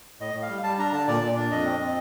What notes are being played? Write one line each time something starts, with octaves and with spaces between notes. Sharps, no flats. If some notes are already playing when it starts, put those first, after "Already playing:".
A2 D#5
A2
F5
G3
G3 A5
D4 A#5
D3 A5
A#2 D5
A#2
D4
F2 D#5
C4
C4